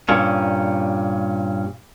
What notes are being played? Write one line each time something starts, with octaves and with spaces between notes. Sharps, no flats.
G2 A#2 C#4